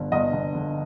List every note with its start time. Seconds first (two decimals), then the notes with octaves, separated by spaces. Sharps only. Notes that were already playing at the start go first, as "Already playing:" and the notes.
Already playing: G1 D3
0.12 G1 D#5
0.33 G1
0.55 D3